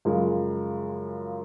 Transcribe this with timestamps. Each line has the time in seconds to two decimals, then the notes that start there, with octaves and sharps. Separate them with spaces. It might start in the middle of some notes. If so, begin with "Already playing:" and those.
0.05 F#2 C#3 F3 G#3